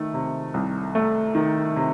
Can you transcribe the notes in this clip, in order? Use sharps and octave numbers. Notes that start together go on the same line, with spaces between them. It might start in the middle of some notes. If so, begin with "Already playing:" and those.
Already playing: D#3 A3
C3
C2
A3
D#3
C3